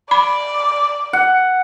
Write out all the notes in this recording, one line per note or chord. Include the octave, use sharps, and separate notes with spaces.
D5 B5
F#5